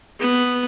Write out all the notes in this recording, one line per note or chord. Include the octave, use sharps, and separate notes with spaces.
B3